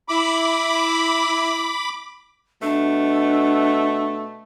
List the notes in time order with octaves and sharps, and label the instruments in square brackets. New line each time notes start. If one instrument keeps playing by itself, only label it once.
[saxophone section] E4 [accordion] B5 D6
[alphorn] B2 [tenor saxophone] A3 [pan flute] D4